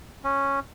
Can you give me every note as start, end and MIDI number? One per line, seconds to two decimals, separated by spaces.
0.24 0.60 61